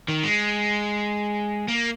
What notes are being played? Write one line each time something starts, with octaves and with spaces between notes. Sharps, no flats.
D#3
G#3
A#3